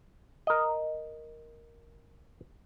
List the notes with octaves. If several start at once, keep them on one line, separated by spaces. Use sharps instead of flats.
A#4 D#5